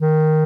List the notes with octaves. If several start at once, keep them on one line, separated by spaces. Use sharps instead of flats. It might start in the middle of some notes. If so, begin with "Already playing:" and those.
D#3